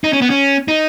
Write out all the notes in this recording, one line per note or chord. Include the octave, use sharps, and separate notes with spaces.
D#4
C#4
B3
C#4
D#4